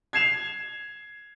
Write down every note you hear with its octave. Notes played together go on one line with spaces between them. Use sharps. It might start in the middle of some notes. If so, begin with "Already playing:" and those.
G#6 C7 E7 F7